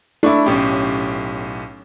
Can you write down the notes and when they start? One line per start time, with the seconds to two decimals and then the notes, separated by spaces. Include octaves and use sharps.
0.23 A3 D4 E4 C#6 D6
0.46 B1 A2 C#4 G4